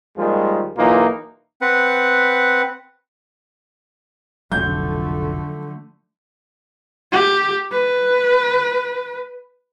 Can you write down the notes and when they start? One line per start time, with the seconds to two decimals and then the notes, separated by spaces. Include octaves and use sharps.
0.17 D#2 D#3 F3 G3 G#3
0.77 B1 E3 A#3 D#4 F4
1.61 C4 B4 F#5
4.52 F1 B1 D3 F3 F#3 A3 G6
7.12 G4
7.72 B4